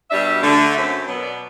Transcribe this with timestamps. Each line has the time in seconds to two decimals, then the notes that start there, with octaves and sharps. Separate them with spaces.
0.10 B2 G3 D4 E5
0.26 E5
0.42 D3 A3 D4
0.75 F#2 F#3 C4 E5
1.07 B2 F#3 B3
1.23 D5